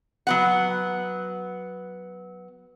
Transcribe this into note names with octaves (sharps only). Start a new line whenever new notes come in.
F#3 B3 F#5